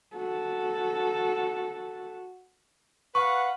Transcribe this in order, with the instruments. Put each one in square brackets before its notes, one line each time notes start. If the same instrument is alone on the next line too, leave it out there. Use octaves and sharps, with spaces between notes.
[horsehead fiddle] F#4 A4
[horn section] B4 F5 F#5 [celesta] C#6